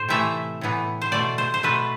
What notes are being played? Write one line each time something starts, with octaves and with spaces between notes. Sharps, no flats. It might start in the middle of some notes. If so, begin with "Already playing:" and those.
Already playing: A2 C5
C3 E3 A3 E5
A2 E3 B3
C5
B2 A3 D5
C5
C5
B2 A3 B4